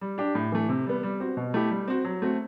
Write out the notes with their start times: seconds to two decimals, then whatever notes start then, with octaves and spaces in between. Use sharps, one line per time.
0.01 G3
0.18 D4 G4
0.35 A2
0.52 E3 A3
0.69 C3
0.86 G3 B3
1.03 G3
1.20 C4 F#4
1.37 B2
1.54 A3 E4 G4
1.71 G3
1.88 C4 F#4
2.05 F#3
2.22 A3 C4 F#4